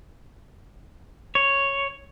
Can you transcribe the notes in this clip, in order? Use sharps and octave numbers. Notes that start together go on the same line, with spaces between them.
C#5